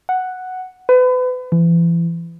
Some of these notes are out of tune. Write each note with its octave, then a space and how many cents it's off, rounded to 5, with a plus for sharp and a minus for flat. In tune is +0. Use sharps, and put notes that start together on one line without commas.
F#5 +0
B4 +35
E3 +35